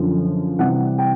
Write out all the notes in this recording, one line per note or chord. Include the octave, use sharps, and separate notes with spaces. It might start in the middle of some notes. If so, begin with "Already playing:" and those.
Already playing: F#2 D3 F3
C3 E3 G3 F#5
G5